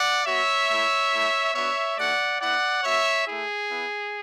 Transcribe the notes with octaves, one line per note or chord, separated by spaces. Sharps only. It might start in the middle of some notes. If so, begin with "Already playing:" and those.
Already playing: D5 F#5
B3 F#4 C#5 E5
A3 E4
A3 E4
B3 D4 F#4 C#5 E5
A3 D4 F#4 D5 F#5
B3 E4 D5 F#5
B3 F#4 C#5 E5
A3 E4 G#4
B3 E4